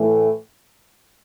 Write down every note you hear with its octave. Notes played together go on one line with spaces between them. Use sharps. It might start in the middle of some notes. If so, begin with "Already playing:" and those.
Already playing: A2 E3 A3